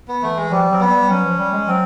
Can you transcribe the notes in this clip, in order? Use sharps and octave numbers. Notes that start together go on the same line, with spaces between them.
B3
E3 A3
G#3
F3 G3
F#3 C4
B3
G3
F#3 C#4
F3
G3
G#3
F#3 C4